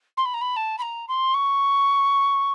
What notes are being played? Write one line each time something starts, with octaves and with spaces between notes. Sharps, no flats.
C6
B5
A#5
B5
A5
B5
A#5
C6
C#6